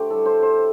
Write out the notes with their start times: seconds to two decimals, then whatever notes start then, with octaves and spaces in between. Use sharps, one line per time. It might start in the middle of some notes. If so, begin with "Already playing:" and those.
Already playing: D3 A3 G4 C5 D5
0.10 A2 G3 A4
0.26 C5
0.42 C5